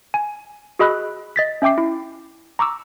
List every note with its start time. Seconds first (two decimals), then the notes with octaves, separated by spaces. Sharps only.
0.14 G#5
0.79 F#4 G#4 D#5 B5 E6 F#6
1.36 D#5 A6 B6
1.62 C#4 E5 G5 D6 C7
1.78 E4
2.59 A#5 C#6 D6 E6